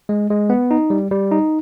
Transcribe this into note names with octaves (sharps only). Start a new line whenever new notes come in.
G#3
G#3
B3
D#4
G3
G3
D#4